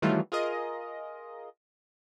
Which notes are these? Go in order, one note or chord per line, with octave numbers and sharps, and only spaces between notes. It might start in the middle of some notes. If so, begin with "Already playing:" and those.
D#3 E3 F#3 G3 A3 F4
F4 G#4 A#4 D#5